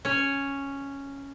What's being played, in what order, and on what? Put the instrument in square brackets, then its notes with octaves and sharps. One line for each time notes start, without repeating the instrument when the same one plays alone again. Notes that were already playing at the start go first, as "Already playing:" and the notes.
[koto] C#4 C#5